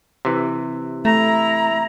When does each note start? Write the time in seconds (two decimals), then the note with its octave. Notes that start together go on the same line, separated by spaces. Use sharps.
0.25 C3 E3
1.05 A3 E4 A#5